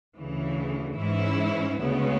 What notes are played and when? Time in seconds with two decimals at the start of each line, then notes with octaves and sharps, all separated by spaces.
0.16 D2 C#3 E3
0.97 G#2 E3 G#3 C#4 E4
1.80 D2 C#3 G#3 B3